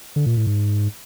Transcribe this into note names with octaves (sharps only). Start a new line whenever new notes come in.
D3
A#2
A2
G#2